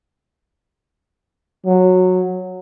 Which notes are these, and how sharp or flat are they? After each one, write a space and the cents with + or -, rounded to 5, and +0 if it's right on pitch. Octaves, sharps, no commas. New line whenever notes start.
F#3 -10